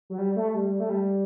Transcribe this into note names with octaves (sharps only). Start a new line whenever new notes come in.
F#3
G3
A3
G3
A3
G3